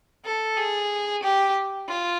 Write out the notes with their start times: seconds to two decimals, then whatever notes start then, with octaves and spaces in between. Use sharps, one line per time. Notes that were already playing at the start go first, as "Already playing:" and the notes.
0.25 A4
0.57 G#4
1.23 G4
1.88 F4